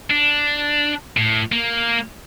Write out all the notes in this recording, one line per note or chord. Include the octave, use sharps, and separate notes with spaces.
D4
A2
A#3